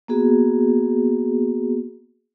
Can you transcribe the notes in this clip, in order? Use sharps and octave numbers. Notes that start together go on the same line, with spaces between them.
A#3 B3 F#4 G#4